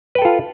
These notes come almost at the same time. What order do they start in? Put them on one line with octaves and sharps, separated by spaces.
B4 G5 A4 F4